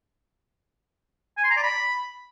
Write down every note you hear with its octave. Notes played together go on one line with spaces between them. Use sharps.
G#5
C6
A#5
D5
B5